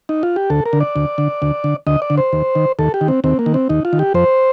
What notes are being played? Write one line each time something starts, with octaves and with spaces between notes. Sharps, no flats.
D#4
F4
G4
D2 A4
A#4
D3
D5
D2
D3
D2
D3
D2 D#5
D5
D3
C5
D#2
D#3
D#2 A4
G4
D#3
C4
D#2 C4
A#3
D#3
C4
D#2 D#4
F4
D#3
G4
F2 C5